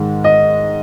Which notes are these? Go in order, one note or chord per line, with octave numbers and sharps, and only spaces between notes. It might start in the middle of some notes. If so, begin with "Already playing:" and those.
Already playing: G#2 D#3 G#3
D#5